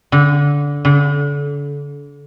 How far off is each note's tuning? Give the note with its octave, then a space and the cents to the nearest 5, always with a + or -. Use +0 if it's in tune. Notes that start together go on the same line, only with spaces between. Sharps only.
D3 -20
D3 -35